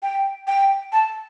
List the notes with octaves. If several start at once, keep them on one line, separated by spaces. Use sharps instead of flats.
G5
G5
A5